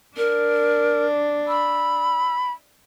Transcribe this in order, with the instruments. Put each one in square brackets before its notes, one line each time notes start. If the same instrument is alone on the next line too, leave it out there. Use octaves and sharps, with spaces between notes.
[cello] D4 [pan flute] A#4
[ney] B5 [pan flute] E6